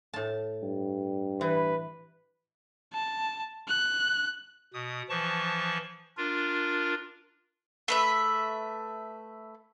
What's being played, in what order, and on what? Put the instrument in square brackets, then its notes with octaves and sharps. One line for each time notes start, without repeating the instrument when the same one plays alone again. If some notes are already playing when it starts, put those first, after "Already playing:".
[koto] A2 A5
[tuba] G2
[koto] E3 [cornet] B4
[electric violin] A5
F#6
[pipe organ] B2 D#6
E3 F3 A5 C#6
D4 F4 A#4
[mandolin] A3 B4 E5